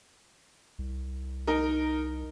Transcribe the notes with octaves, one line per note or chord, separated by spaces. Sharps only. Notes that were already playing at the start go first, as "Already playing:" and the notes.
C2
D#4 A#4